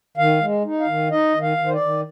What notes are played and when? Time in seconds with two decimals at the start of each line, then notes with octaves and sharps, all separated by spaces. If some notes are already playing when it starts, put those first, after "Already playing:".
0.17 D#3 F5
0.41 G#3
0.64 D#4
0.80 F5
0.87 D#3
1.11 D#4 D#5
1.34 D#3
1.42 F5
1.57 D#3
1.66 C5
1.73 D5
1.81 D#3